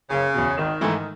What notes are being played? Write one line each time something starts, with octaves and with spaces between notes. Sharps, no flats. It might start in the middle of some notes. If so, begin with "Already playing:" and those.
F#1 C#3
E2 B2
G#1 D#3
G#2 E3 A3 E4